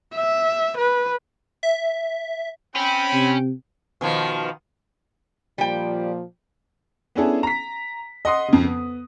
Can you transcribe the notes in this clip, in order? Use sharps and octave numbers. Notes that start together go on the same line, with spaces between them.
E5
B4
E5
C4 C#4 G5 B5
C3
B2 D#3 F3
A#2 F3 G3 G5
B3 C#4 D4 E4 G#4 A4
A#5 B6
D#5 F#5 C6 D#6
F2 C#3
B3